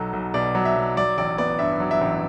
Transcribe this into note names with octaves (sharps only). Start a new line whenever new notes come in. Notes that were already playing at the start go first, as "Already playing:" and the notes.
Already playing: B1 F#3 A4
B1
B2 D5
F#3
E5
B1
F#3 D5
A1 D5
B3 D5
G2 E5
F#3
E5
A1